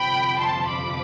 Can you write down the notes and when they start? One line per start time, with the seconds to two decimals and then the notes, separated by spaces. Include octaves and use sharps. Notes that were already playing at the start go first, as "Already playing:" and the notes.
Already playing: G1 F2 C3 F3 G5 B5
0.39 A5 C6
0.68 B5 D6